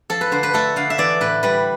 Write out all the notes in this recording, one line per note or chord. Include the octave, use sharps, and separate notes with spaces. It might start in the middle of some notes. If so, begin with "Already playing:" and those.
F3 A4
B4
D3 C5
B4
A3 A4
D3 F5
E5
E3 D5
A2 B4
G3 B4